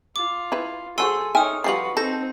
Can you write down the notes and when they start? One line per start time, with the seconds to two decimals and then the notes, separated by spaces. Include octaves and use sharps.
0.16 F4 D6
0.52 E4 B4
0.98 F#3 F#4 G#4 A4 C5 G#5 C6 E6
1.35 D#4 C#5 E5 G5 G#5 D#6 F6
1.64 F3 G3 F4 F#4 B4 C7 F#7
1.97 C4 D#4 A4 A5 G6 A#6